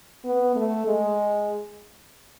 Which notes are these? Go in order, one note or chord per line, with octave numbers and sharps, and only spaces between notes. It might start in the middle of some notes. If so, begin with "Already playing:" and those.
B3
A3
G#3